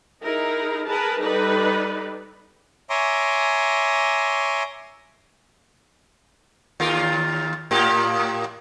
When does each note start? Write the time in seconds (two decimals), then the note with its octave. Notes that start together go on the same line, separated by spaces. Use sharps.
0.22 D#4 E4 G#4 A#4
0.85 G#4 A#4 B4 A5
1.20 G3 D#4 A4 B4 D5
2.90 C#5 E5 G#5 A#5 C6 D6
6.80 D#2 F4 A#4
7.71 A2 A#3 G4